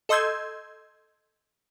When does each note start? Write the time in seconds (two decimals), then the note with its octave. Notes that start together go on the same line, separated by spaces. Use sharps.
0.09 A4 D#5 C6 E6 G6 G#6